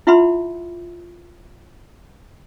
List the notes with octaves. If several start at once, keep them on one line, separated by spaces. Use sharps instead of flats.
E4 F4 E5 F#5 B5 C6